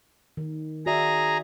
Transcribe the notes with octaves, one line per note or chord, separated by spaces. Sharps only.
D#3
F#4 G#4 D5 E5 A#5